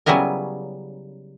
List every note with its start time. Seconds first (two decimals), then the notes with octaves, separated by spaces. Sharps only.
0.06 C#3 F#3 G3 B3 E4 A#4